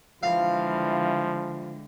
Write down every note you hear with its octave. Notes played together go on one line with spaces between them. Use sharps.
D3 E3 F3 G3 G#3 F4 F5